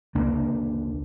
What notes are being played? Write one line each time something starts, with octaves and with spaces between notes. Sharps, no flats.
C#2 A#3 D4